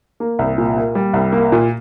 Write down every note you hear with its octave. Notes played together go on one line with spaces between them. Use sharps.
A#3
C2
A#2
A#3
G3
C2
A#3
A#2